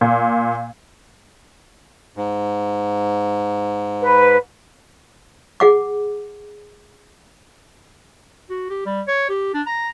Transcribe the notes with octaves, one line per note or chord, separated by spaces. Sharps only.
A#2
G#2
B4
G#4 F#5 D6
F#4
G4
G3
C#5
G4
D4
A#5